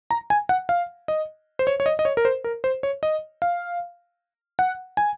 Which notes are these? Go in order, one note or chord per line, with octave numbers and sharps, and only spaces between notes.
A#5
G#5
F#5
F5
D#5
C5
C#5
C#5
D#5
D#5
C#5
A#4
C5
A#4
C5
C#5
D#5
F5
F#5
G#5